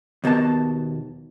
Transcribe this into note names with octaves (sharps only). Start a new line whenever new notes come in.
D#2 B2 A#3 A5